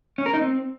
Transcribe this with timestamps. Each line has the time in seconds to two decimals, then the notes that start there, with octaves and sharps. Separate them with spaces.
0.18 C#4
0.26 A#4
0.34 D#4
0.41 C4